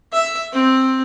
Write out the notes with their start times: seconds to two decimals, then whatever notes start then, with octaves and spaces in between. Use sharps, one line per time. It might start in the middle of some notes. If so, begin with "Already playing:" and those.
0.13 E5
0.52 C4